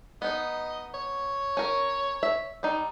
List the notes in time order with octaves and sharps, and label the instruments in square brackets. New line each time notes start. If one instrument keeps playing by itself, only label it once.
[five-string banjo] B3 D#4 [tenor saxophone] D#5
[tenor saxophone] C#5
[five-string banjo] C#4 A#4
E5
G3 D#4